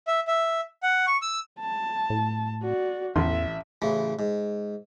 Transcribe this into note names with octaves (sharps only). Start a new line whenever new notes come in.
E5
E5
F#5
C#6
E6
A5
A2
F#4 D5
A1 E2 E5 C6
A1 C#3 E3
G#2